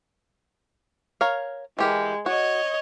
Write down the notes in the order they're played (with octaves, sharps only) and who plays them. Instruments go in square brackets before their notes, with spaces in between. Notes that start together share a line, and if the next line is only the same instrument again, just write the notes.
[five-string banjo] A#4 C#5 F5
[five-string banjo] E3 G4 A#4 [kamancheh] G#3
[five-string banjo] F#4 [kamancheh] C#5 D#5